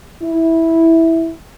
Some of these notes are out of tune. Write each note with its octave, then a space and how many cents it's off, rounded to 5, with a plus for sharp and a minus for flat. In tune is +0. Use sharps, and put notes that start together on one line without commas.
E4 -10